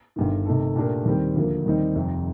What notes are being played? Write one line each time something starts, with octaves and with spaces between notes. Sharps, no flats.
G1 G2 D#3
C3 D#3 A3 D#4 A4
A#2 A3 D4 G4 A#4
D#2 D#3 G3 C4 G4
D2 D3 F3 A#3
D#2 D#3 G3 C4 D#4
F1 F2 C3